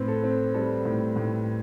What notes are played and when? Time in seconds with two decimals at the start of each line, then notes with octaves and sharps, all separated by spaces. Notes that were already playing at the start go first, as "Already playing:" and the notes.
Already playing: A2 C4 B4
0.08 A4
0.23 C4
0.54 G3 A4
0.85 A2
1.16 A2